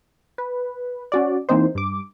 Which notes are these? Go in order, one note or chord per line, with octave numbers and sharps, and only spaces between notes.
B4
C#4 F#4 D5
E3 A#3 C4 D#4 C5
G2 D6